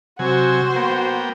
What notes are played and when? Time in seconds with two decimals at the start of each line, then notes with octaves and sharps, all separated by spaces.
0.19 C3 F#3 F#4 C5 G#5
0.76 A#3 B3 G5